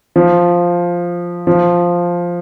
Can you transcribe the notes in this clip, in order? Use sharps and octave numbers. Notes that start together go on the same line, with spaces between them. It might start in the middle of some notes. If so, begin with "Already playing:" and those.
F3
F3